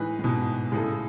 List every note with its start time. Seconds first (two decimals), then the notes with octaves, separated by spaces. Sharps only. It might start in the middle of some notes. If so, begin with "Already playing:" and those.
Already playing: A2 E3 G#3 D#4 G#4 B4
0.19 A2
0.24 G#2 B2
0.72 A2 C#3 G#3 D#4 A4